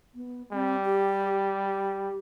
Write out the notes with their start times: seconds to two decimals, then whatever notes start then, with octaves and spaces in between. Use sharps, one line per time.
0.15 B3
0.53 G3 C4
0.85 G4
1.64 G4